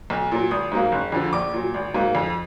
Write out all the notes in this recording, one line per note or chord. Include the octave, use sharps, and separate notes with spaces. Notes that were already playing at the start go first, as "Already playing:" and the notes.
B1
A#2 F#3
G#1 D#6
G#2 F#3 A#3
F#1
F2 D3 F3
A#1 D6
A#2 F#3
G#1
G#2 F#3 A#3
F2